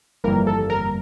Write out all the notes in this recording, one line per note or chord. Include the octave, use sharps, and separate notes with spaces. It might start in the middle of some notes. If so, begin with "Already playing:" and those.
G1 F2 E3 G3 A#3 A#4
A4
A#4